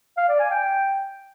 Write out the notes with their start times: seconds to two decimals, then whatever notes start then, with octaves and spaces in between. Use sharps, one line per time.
0.17 F5
0.29 D5
0.40 G#5
0.51 G5